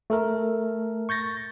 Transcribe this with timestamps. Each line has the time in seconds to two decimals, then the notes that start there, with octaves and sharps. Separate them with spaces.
0.10 A3 A4 A#4
1.09 C#6 G6 A6 A#6